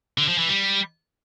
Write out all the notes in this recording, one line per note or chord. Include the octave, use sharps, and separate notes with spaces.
D3
F3
E3
G3